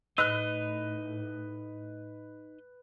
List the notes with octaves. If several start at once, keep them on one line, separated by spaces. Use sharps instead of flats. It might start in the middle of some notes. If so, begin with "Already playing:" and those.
A2 D#4 B4 D#5 E6 F#6